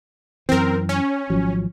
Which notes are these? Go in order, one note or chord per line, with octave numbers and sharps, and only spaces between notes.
F#2 E3 C4 A#4
C#4
G#1 F3 F#3